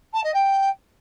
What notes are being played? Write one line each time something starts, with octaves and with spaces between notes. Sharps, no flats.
A5
D#5
G5